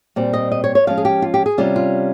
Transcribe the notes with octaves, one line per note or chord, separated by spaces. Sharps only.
A#2 G3 C4
D#5
D#5
C#5
C#5
F3 G#3 C#4 F5
G#4
G4
F4
G4
G#4
C3 G3 C#4 F4
F4